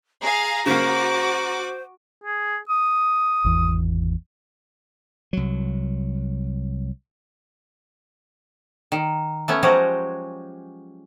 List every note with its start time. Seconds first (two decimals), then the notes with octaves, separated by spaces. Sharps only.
0.22 G#4 F5 A#5
0.66 C#3 A#3 F#4 C5 D6
2.24 G#4
2.69 D#6
3.44 G#1 E2
5.33 C2 F#3
8.92 D#3
9.48 A3 B3 C#4
9.63 F3 F#3 G#3 F#4 G4 A#5